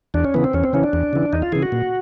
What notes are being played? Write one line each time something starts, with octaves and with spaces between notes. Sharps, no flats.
E2 D4
C#4
C#3 E3 B3
C4
E2 C#4
C4
C#3 E3 C#4
D4
E2
C#3 E3
E2 D#4
F4
C#3 E3 G#4
F#4
A#2